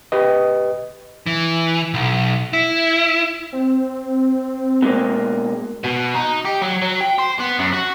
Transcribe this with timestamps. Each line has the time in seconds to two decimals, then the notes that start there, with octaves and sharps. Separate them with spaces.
0.12 G4 B4 D#5
1.26 E3
1.94 B1
2.53 E4
3.53 C4
4.82 B2 G#3 A#3
5.84 B2
6.15 D#4
6.45 G4
6.62 F#3
6.82 F#3
7.01 G5
7.18 C5
7.39 B3
7.59 F#2
7.73 F#4